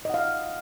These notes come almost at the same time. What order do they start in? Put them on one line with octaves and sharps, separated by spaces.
D#5 F#5 F5